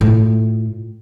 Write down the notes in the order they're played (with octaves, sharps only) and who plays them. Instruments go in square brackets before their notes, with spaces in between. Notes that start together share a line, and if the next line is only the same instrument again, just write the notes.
[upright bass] A2 F4